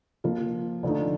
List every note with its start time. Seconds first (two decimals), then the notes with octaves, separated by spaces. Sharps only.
0.24 F3 A#3 F4
0.83 D3 F3 A3 D#4